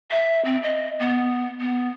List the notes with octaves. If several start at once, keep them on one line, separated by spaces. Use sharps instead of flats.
E5
C4
D#5
B3
B3